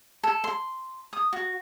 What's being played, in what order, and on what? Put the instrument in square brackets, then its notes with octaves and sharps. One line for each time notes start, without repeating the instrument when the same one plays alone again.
[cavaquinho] A4
C6
D#6
F#4